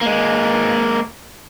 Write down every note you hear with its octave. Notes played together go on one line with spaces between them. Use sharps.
G#3 A#3